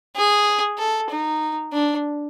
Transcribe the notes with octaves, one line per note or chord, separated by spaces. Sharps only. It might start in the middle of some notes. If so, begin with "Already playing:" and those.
G#4
A4
D#4
D4